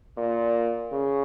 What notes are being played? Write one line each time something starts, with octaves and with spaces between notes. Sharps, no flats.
A#2
C#3